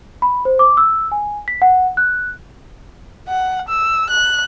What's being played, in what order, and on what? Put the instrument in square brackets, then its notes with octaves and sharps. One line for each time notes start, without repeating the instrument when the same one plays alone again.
[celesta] B5
C5
D6
E6
G#5
B6
F#5
F#6
[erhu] F#5
E6
F#6